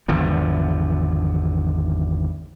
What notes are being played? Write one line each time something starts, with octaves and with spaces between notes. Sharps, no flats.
G#1 E2 D3 F3